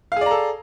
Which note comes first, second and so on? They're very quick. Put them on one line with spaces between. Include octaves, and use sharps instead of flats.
F5 G#4 D5 A#5 A4